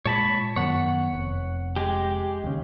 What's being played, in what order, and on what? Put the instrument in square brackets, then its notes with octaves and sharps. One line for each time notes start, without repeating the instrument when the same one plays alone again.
[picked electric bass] A#2 G#3 [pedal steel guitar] C#5 A5 B5
[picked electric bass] F#2 D#3 B3 [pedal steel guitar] C#5 F#5
[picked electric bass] F1
[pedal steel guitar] G#3 G4
[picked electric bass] D#2 C#3